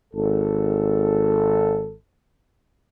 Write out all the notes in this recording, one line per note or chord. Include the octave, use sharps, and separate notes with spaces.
G#1 A4